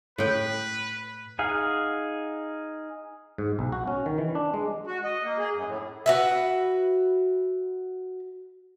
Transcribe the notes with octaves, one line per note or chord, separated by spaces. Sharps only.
A2 B4 G5
D#4 G#4 F5 F#5
G#2
B1
F#4
C#4
D#3
E3
D4
G#3
F#4
D#5
A#3
G#4
F#2
A2
F#4 B4 E5